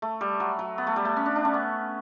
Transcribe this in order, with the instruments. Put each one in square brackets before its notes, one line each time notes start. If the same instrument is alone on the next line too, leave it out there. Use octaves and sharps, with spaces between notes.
[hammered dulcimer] A3
G3
F#3
F#3
B3
A3
G3
A3
C#4
D4
D4
C#4
B3